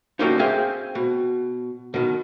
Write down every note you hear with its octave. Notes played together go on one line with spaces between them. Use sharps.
D3 F#3 G3 A#3 C#4 D#4
C4 G#4 E5 F5 G5
B2
B2 D#3